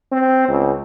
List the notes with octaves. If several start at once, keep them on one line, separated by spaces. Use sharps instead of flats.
C4
C#2